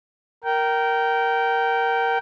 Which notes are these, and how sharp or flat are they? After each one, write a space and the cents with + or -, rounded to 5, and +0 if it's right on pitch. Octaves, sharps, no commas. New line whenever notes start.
A#4 +0 G5 -20